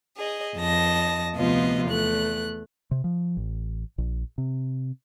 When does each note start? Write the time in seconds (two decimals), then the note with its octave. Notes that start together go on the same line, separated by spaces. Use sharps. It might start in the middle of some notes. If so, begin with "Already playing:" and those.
0.17 G#4 D#5
0.56 F2 D#5 A5 A#6
1.34 D2 C3 F3 B3 F4 D#5
1.86 E2 A3 F#6
2.91 C3
3.04 F3
3.37 A1
3.98 A#1
4.38 C3